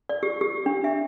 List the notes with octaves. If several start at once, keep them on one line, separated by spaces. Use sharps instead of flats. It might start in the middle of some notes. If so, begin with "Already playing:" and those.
D5
G4
G4
D4
E5